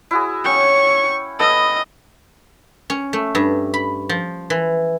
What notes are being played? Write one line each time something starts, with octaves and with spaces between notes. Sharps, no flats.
E4 F#4 G#4
C#4 F#5 G5 C#6
B3 A4 D#5 E6
C#4
A3
G2
B5
F3
E3